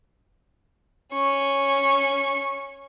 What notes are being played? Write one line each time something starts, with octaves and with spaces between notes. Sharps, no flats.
C#4 C#6